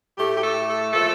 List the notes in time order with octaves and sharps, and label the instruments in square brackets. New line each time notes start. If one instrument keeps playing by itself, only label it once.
[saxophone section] A2 A3 G4
G4
A4
A4
A#2 F3 A3 A4